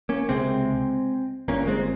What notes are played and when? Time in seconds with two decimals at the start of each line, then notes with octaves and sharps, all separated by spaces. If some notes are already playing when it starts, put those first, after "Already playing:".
0.09 A#3 C#4
0.29 C#2 C3 G#3 C4
1.48 G1 G2 A#3 C#4
1.67 G#3 C4